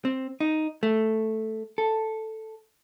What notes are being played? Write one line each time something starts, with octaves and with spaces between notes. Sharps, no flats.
C4
D#4
A3
A4